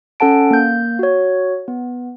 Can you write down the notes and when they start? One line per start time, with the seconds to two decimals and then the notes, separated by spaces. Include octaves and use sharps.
0.20 C#4 A4 F#5 A5 D7
0.51 A#3 G6
0.99 F#4 C#5
1.68 B3